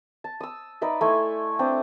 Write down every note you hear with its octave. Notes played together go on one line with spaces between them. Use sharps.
A5
D#6 E6
D#4 B4 D5 E5
A3 E4 G#5 C6
C4 D4 B4 G5